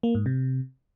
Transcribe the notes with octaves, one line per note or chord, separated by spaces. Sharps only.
A#3
G#2
C3